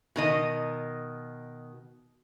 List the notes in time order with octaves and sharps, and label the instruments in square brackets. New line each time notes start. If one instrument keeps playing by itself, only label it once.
[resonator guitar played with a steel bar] B2 D#3 D#5